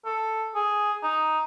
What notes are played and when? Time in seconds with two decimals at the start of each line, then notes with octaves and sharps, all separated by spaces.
0.05 A4
0.55 G#4
1.03 D#4